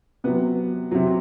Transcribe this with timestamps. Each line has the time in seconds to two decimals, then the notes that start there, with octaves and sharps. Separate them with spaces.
0.24 C3 F#3 B3
0.91 C3 F#3